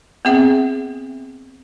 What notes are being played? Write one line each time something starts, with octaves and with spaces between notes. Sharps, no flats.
B3 C4 G#4 E5